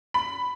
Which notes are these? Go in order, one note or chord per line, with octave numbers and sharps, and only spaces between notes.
B5